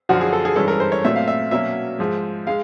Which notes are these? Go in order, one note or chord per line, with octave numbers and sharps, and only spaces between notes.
F#2 D3 F3 F#4
G#4
A4
G#4
G2 E3 G#3 C#4 A4
A#4
C5
C#5
A#2 F#3 A3 C4 E5
F5
E5
B2 F#3 A#3 C#4 E5
G#2 F3 G#3
G#3 F5